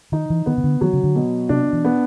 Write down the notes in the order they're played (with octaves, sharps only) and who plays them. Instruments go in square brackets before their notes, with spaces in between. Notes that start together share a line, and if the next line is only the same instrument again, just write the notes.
[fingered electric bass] D#3 [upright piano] D#4
[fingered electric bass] E3
[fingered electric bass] D#3 [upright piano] B3
[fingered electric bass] C#3
D3
[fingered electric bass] D#3 [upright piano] F#3
[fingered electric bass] C#3
D3
[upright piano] B2
[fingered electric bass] C3 [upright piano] D4
[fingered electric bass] E3
[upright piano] B3